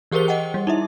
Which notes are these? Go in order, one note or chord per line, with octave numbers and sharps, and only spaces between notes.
E3 G4 G#4 A#4 C5 G7
D#5 F#5 G5
G3
D#4 E4 E5